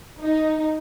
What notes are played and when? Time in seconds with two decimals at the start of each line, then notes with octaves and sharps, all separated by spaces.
0.19 D#4